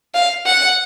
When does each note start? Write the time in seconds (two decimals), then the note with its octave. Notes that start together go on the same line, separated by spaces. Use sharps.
0.14 F5
0.47 F#5